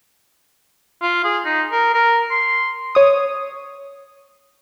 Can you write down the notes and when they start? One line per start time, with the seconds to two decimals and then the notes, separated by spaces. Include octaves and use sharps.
1.02 F4
1.25 G#4
1.45 D#4
1.72 A#4
1.94 A#4
2.31 C6
2.95 C#5 D#6